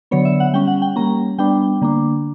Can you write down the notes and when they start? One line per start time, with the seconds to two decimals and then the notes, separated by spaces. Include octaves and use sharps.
0.11 D3 F#3 B3 C#5
0.25 E5
0.40 F#5
0.53 G3 C#4 G5
0.67 F#5
0.82 G5
0.96 G3 A#3 C#4 A#5
1.38 G3 B3 D4 G5
1.81 D3 A#3 D4